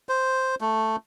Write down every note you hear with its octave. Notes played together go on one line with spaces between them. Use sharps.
C5
A3